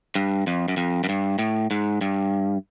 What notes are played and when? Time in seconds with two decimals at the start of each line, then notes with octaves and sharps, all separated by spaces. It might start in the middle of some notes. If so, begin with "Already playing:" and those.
0.15 G2
0.47 F2
0.68 F#2
0.77 F2
1.04 F#2
1.09 G2
1.39 A2
1.71 G#2
2.01 G2